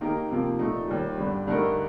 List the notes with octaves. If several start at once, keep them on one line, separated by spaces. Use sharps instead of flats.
D#3 A#3 D#4 G4 A#4
C3 F3 A#3
A#2 A3 D#4
D#2 D#3 G3
G2 D3 G3
G2 D3 A3 D#4 A#4